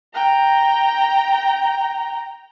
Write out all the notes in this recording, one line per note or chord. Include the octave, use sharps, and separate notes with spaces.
G5 A#5